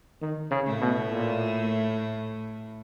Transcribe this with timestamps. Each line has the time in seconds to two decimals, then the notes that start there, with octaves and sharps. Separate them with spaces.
0.21 D#3
0.51 C#3
0.66 A2 A3
0.81 B2
1.12 A#2